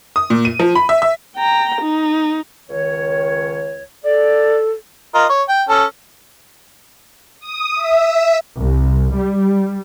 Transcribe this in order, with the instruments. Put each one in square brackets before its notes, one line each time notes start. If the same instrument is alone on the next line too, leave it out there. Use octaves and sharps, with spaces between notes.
[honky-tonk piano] D#6
A#2
D#7
F3
B5
E5
E5
[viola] G5 A#5
D#4
[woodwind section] C#2 D#3 C#5
[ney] A4 [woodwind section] D5
[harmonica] F4 A#4 D#5
C#5
G5
C#4 A4
[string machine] D#6
E5
[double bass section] C2
G3